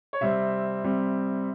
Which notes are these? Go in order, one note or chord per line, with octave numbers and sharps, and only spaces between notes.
C#5
C3 G3 C4 E5
C3 G3 C4